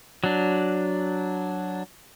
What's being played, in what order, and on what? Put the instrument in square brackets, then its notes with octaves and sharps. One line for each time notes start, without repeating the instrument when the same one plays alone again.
[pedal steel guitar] F#3 D4